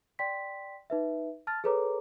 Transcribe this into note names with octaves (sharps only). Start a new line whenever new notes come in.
D5 G5 C6 B6
D#4 B4 E5
A5 F6 A6
G#4 A4 B4 C#5 A#5 D6